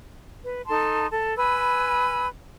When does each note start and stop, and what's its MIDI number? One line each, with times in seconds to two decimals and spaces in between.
0.44 0.62 71
0.67 1.07 63
0.67 1.07 69
0.67 1.07 81
0.67 1.07 84
1.11 1.35 69
1.11 1.35 81
1.37 2.27 71
1.37 2.27 80
1.37 2.27 83
1.37 2.27 88